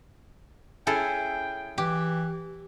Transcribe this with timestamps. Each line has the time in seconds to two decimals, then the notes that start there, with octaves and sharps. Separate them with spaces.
0.87 C#4 E4 G#4 A4 G5
1.78 E3 G4